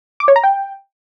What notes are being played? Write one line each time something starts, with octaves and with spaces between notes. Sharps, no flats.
D6
C#5
A#5
G5